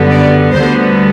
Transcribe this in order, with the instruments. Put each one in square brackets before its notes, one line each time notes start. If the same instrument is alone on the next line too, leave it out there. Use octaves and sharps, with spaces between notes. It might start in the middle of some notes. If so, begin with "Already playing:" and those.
Already playing: [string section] F#2 D3 G3 B3
D5
D2 D3 G3 B3 C5